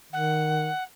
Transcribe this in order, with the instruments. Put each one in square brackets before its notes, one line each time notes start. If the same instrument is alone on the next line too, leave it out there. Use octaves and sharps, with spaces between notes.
[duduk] D#3 [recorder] F#5